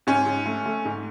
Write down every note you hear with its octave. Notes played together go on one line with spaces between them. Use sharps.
G#2 C#4
G#2
A3
A3
G#2